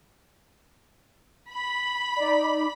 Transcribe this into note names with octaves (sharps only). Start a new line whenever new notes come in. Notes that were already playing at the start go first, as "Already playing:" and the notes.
B5
D#4 D5